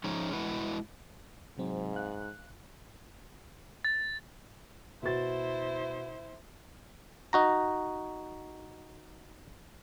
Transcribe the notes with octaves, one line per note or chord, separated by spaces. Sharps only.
F3 G#3 C#4 D#4
G#3 E4 F#4 B4 F#5
G#2 C3 F#3 C4
F5 F#6
A6
B2 E4 C5 A6
D#4 F#4 A#5